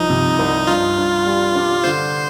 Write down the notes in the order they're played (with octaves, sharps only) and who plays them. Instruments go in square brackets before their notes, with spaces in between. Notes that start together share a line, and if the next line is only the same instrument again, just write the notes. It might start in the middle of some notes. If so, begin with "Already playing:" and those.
Already playing: [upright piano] C2 F3 [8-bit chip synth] D#4
[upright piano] C3
C2
[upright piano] G2 [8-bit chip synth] F4
[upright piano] G2
G3
D4
[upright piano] D3 [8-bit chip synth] C5